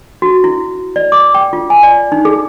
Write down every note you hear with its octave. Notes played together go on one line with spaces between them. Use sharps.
F#4
E4
D5
D6
G5
F4
G#5
D5
D#4
G#4